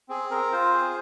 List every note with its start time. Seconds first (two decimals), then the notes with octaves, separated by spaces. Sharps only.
0.09 C4 G#4
0.31 C4 A#4
0.52 F4 C5
0.74 G#4